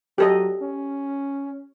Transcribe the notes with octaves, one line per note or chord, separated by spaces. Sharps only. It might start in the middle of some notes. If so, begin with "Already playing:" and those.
F#3 G4 A4 D#5
C#4